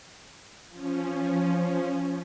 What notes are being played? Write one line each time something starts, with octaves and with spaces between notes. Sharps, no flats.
F3 C#4